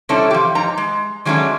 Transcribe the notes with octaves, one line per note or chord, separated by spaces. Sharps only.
C3 G3 C#4 D4 E4 A4
F3 G4
G#2 D#4 A#5
G#3
D#3 F#3 G#3 A3 C#4 D4